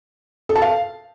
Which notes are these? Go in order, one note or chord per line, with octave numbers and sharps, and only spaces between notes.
A4
A5
F5